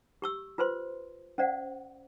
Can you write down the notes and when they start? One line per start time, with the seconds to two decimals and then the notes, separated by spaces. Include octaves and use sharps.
0.22 G4 C#6 E6
0.58 F4 B4 C5 C6
1.38 C#4 C5 D5 F5 F#5